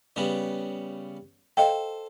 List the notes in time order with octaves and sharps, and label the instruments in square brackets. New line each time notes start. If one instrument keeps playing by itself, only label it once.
[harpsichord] C#3 G3 B3
[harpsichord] A4 C5 [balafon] D#5 F5 G5